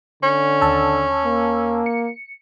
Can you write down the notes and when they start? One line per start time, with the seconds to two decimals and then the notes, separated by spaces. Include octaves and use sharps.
0.23 D3 C#4
0.61 D#2 A5 E6
1.25 A#3
1.86 C#7